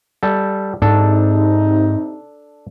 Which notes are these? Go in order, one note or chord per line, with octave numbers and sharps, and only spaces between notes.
G3 A4
G#2 C3 D4 D#4 A4